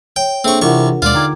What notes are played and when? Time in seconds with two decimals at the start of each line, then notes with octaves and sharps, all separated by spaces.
0.16 C#5 G5
0.44 A#3 C4 D4 G#4 A4 E5 C#6
0.61 C2 E3 F4 A#4 F#5 C#6
1.02 D#2 B2 G#3 F4 D5
1.14 D3 D#4 G5 A#5 D6 G#6